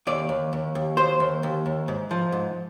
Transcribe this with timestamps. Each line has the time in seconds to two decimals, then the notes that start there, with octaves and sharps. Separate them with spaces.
0.07 D#2 D5
0.29 D#2
0.53 D#2
0.75 D#2
0.97 D#2 C5
1.20 D#2
1.43 D#2
1.66 D#2
1.88 G#2
2.11 F3
2.32 G#2